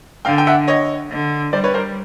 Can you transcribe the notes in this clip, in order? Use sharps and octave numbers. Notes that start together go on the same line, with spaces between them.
D3 F5 G5
G5
E5 F#5
C#5 D#5
D3
G3 C5 D5
B4 C#5
A#4 C5